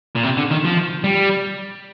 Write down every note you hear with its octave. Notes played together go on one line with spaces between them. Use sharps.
A#2
C3
D3
D#3
F3
G3